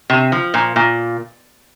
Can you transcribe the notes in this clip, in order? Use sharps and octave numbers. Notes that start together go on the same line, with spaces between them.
C3
F3
A#2
A#2